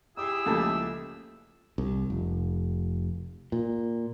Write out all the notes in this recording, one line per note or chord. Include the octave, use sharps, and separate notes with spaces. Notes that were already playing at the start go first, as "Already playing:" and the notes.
E4 G4 G#4 D#6 E6 C7
C#2 F3 A3 A#3 F4 A5
C2
F1
A#2